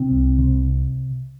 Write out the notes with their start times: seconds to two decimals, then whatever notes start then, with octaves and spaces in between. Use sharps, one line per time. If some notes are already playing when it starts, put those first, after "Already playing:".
Already playing: C3 C4
0.11 C2
0.39 C3